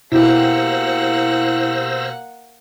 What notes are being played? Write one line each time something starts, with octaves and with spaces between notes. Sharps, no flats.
B2 A#3 E4 G4 C5 F#5 E6 A#6